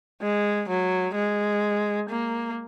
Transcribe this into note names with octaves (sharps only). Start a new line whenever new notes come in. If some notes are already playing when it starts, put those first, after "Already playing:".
G#3
F#3
G#3
A#3